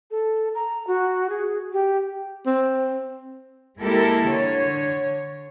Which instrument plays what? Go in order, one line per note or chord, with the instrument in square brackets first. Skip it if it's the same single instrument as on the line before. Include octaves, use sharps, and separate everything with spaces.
[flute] A4
A#5
F#4
G#4
G4
[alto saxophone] C4
[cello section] G#3 A#3 E4 G4 A4 A#4
D3 C#5